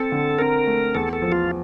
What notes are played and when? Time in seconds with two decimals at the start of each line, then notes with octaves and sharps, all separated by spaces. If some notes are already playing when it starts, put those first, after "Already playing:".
Already playing: C4 A4
0.12 D3
0.39 C4 A#4
0.66 A3
0.95 E2 A4
1.13 A4
1.22 F3
1.32 F4